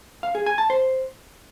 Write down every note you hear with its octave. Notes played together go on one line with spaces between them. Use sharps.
F5
G#4
G#5
A5
C5